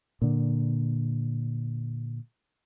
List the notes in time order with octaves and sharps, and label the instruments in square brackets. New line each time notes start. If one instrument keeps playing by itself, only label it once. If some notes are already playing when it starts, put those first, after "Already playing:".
[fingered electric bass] A#2 D3